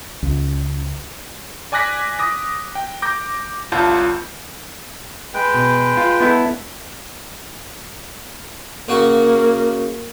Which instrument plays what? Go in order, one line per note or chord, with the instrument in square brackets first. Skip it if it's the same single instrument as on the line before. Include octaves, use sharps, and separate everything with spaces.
[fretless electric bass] C#2
[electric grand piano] D5 G#5 D6 F#6 A#6 B6
D6 D#6 A#6
G5
D6 G6 A#6
G1 C2 F4 A5 G6
[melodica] G#3 B4 G5
[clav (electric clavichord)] B2
F4
B3 E4 A4
[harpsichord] C#3 F#4 [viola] A#3